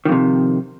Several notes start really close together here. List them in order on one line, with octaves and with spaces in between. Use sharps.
D#3 F2 C3